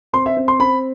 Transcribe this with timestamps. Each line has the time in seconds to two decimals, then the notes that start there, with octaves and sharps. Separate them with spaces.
0.13 C4 C6
0.26 E5
0.37 C4
0.48 C6
0.59 C4 B5